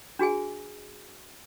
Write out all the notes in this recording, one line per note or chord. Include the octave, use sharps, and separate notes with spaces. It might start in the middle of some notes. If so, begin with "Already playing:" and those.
D4 F#4 G#4 G#5